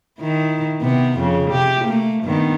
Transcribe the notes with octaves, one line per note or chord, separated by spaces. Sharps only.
D#3 E4
C3 B3
F2 C#3
C3 G4
A3 A#3
G2 D#3 B3